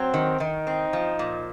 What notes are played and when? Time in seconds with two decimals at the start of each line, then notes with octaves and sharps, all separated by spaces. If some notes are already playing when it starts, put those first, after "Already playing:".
Already playing: F#3 C4
0.14 D#3
0.40 D#3 D#4
0.67 C4
0.93 F3
1.19 A#2